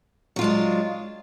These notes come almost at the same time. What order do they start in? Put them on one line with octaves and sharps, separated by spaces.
F#3 F4 G#3 D4